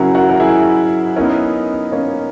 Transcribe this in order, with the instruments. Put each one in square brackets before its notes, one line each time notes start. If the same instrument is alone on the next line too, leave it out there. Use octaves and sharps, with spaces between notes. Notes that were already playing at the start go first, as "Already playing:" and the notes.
Already playing: [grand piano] C#3 F#3 C#4 E4 [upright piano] F#4 G#4 A#4
[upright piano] F#4 A#4
A#4
E4 G#4
[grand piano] B3 D#4 A#4 D#5 [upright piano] C#4 E4
[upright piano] A#3 C#4